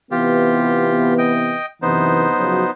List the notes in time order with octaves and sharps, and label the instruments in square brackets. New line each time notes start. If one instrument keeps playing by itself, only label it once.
[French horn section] C3 E3 B3 [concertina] F4 G4
[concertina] D#5 G5
[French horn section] F#2 C3 E3 [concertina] B3 D#4 C5
[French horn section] C#3 F3 F#3